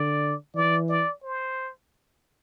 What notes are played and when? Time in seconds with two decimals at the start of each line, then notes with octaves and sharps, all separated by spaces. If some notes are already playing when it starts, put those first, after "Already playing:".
Already playing: D3 D5
0.55 E3 D5
0.89 D5
1.23 C5